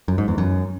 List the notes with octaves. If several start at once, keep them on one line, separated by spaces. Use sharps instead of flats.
F#2
G#2
E2
F#2